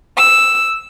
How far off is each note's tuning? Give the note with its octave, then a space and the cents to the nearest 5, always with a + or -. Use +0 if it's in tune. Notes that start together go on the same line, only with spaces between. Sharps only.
E6 +0